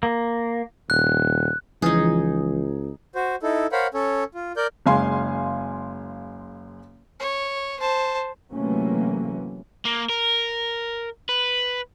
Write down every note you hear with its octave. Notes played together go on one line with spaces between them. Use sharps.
A#3
D#1 F#6
C#2 E3 F3 D#4 G#4
F#4 C5
D#4 E4 A4
A#4 C5 C#5 F5 F#5 B5
C#4 A4 C#5
F4
A#4 D5 G6
F#1 G#3 F5 G#5 C6
C#5
C5 A5
C3 E3 F#3 A3 A#3 C#4
A#3
A#4
B4